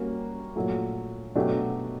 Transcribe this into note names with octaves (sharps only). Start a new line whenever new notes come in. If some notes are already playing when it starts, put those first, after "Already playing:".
Already playing: G3 A#3 C#4 F#4
A#2 F#3 A3
B2 F#3 A3 D4 G4